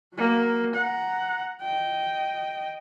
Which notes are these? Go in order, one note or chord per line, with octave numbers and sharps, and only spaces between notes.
F#3 A#3
F#5 A#5
D#5 G5